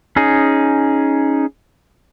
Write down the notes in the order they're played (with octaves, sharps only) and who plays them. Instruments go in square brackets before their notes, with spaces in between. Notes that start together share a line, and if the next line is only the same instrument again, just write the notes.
[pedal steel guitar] C#4 D#4 G#4